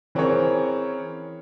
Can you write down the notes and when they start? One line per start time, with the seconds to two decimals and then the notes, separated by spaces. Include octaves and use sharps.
0.15 E3 C4 C#4 G#4 A#4 C#5